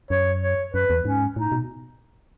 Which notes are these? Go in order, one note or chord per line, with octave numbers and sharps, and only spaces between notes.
F#2 C#5
C#5
F#2 B4
E2
G#2 C#4
A2 D#4
B2